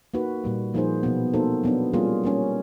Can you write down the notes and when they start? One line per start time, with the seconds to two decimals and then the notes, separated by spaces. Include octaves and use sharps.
0.14 A#3 D#4 F#4 B4
0.44 A#2 G3 A#3
0.74 F3 A#3 D#4 G#4 C5
1.03 B2 F#3 B3
1.34 A#3 D#4 F#4 A4 C5
1.64 F#3 B3 D4
1.93 G3 A#3 C#4 F4 G#4
2.24 G3 A#3 C#4